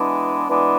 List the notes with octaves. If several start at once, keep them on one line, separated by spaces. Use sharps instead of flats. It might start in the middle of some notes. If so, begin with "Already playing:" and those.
Already playing: E3 G#3 B3 D4
E3 G#3 B3 D4